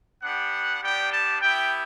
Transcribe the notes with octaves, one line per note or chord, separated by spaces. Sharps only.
B3 D4 G4 F#5
G3 B3 D4 G4 G5
A5
B3 E4 G4 G5